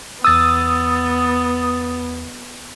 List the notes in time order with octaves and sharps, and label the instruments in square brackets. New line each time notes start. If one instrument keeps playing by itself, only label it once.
[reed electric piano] E2 E6 [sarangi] B3 [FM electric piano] D#6 A6